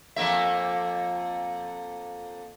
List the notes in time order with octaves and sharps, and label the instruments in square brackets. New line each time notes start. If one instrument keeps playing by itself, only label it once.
[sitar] F2 A#3 E5